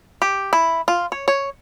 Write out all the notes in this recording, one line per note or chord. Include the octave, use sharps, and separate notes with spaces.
G4
E4
F4
C#5
C#5